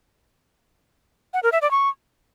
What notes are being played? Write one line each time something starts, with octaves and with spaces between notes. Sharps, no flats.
F#5
A#4
E5
D5
C#6